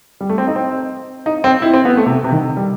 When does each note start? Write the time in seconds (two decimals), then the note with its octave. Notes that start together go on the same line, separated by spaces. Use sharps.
0.21 G3
0.29 A3
0.38 C4
0.47 D#4
0.56 C4
1.26 D#4
1.44 C4
1.62 E4
1.74 C4
1.85 B3
1.97 A3
2.06 C3
2.24 C3
2.32 D#3
2.57 G3